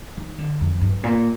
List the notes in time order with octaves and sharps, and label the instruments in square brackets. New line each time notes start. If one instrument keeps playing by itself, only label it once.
[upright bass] D#3
D3
F2
G2
A#2